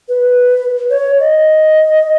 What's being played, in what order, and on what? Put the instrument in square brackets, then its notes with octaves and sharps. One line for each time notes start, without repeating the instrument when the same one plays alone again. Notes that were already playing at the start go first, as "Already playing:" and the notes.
[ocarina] B4
C#5
D#5